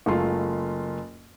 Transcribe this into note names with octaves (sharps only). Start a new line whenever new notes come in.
F#1 G#3 A3 F4 C6